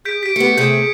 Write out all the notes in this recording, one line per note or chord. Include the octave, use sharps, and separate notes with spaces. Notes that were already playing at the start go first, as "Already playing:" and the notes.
G#4 G6 B6 D7
G4 B6 D7
A3 B3 G4 C#7
C3 A3 G#4 G6